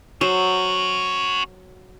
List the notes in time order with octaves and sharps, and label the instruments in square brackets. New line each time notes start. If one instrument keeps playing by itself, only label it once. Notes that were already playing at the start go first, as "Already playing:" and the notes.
[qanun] F#3 C5 [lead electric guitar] C#4 F#4